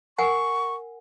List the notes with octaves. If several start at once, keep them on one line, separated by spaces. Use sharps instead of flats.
A#4 F#5 G#5 C#6